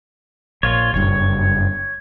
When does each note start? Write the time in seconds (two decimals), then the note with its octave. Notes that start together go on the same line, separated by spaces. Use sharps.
0.63 A#1 F4 C#5
0.94 F#1 G2 C#5